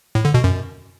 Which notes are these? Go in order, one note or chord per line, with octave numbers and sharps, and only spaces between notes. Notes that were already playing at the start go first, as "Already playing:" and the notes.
A2
D3
B2
F#2